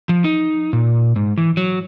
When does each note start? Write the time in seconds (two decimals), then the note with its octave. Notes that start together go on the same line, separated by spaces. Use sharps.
0.09 F3
0.24 D#4
0.73 A#2
1.16 G#2
1.38 E3
1.57 F#3